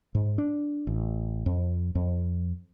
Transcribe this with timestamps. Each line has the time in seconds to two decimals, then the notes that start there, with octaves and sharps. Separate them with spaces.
0.15 G#2
0.38 D4
0.87 A1
1.46 F2
1.95 F2